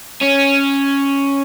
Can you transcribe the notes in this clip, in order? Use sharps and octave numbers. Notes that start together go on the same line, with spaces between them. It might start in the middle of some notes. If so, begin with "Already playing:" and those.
C#4